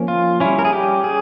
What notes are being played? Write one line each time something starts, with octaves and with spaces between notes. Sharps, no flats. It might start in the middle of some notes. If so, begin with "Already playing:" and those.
Already playing: F3 A#3 C#4
F4
G3 C#4 E4
A#4
G#4
G4
G#4